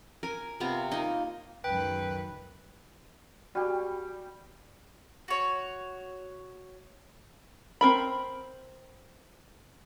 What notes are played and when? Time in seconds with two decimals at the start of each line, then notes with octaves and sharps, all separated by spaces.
0.23 A#4 G#5
0.60 C3 B3 F4 A#5
0.91 A#3 D#4 D#5
1.64 C#2 F#2 D#3 B4 G5
3.55 G3 F#4 G4 G#5
5.28 F#4 C#5
7.81 C4 A#4 B5